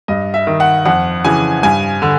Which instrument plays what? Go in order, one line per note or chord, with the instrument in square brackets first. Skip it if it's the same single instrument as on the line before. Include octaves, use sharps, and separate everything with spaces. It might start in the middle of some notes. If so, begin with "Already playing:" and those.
[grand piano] G2 D#5
E5
D#3
F#5
F2 F#5
C#3 E3 G#5
G2 G#5
D3